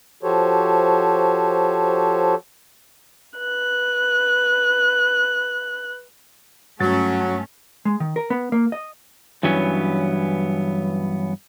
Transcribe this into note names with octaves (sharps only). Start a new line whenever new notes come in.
F3 F#4 G4 A4 C5 C#5
B4 F#6
G2 F#3 A3 C#4 A6
G#3
D#3
A#4
B3
A#3
D#5
G2 E3 F#3 B3 C#4